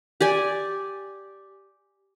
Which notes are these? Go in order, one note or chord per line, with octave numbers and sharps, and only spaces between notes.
G4 D5 G#5